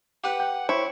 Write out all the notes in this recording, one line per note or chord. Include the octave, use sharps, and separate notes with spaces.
G4 B4 F#5
G5
E4 C5 C#5 C#6